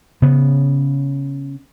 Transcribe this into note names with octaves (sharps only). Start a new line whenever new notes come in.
C#3 B3